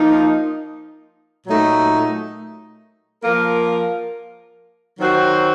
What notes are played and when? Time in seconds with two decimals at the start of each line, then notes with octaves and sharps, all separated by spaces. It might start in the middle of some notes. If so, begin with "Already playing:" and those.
Already playing: F3 A#3 D#4
1.45 A#2 F#3 A3 D#4
3.22 F3 A#3 F4 A#4
4.98 D#3 F#3 C4 F#4 C5